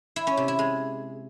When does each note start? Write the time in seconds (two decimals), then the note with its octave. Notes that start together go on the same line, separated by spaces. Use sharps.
0.16 E4
0.27 C#4
0.37 C3
0.48 E4
0.59 G#3